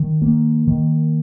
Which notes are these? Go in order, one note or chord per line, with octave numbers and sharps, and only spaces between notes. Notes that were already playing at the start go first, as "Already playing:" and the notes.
Already playing: D#3
A#3
D#3